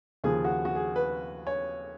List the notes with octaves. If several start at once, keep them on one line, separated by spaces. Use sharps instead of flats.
D#2 C#3 F3 G#4
F#4
F#4
G#4
B4
C#5